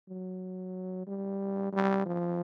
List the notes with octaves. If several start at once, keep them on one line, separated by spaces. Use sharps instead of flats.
F#3
G3
G3
F3